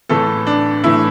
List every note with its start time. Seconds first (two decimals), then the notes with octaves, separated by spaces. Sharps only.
0.09 A1 A2 E3 A3 A4
0.47 D4
0.84 A2 E3 A3 E4